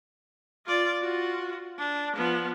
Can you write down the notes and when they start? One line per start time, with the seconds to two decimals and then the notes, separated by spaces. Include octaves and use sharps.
0.66 F4 D5
1.02 F4 F#4
1.78 D4
2.16 F3 B3